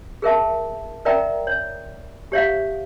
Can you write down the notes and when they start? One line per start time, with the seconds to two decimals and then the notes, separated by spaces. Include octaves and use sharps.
0.22 G#4 A#4 E5 A5
1.05 A#4 D5 E5 G5 A#5
1.47 C#5
2.32 G4 C#5 E5 F5